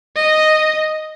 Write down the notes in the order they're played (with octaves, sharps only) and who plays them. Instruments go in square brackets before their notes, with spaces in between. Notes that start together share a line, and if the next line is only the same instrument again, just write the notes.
[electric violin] D#5